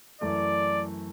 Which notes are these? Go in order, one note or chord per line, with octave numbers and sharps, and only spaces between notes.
F#2 E3 A3 D5